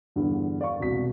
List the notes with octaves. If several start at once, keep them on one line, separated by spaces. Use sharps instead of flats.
E2 G2 D3
D5 F5 C#6
E1 C2 F#4 B6